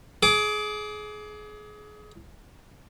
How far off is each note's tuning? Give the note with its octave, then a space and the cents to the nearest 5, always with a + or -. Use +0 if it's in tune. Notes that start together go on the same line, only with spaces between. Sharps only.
G#4 +25 D6 -10